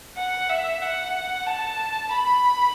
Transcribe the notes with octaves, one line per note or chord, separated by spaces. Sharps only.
F#5
E5
F#5
A5
B5